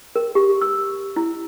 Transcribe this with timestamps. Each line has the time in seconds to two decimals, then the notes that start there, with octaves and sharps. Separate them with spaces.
0.16 A#4
0.35 G4
0.61 E6
1.16 E4